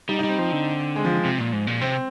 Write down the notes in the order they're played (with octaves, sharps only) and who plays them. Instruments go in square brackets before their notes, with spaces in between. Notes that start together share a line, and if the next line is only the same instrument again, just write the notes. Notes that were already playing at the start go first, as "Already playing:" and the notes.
[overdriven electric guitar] G3 [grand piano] D#4
[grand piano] D#4
[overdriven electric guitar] G3 [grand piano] C4
[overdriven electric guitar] F3 [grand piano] C4
[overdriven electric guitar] D3
[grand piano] G#3
F3
[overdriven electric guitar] C3
A#2
G#2
A#2
[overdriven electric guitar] C3 [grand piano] C4